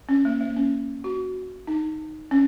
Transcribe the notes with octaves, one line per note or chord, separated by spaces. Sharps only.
C#4
A#3
A#3
C#4
F#4
D#4
C#4